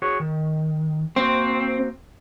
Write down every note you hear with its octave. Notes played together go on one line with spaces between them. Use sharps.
F#4 G#4 C#5
D#3
A#3 C4 F#4 C5